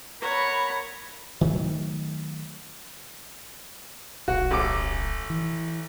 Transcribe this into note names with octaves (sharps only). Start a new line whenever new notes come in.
A#4 C#5 F#5 A#5 B5
D#3 F#3 A3
D1 B1 F#4
A1 D6
E3